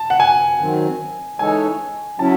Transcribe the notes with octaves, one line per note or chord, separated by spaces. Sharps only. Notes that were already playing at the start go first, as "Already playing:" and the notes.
Already playing: A5
F#5
G#5
D#3 F#3 C4
E3 G#3 D#4 A4 C#5 G#5
F#3 C#4 E4 A5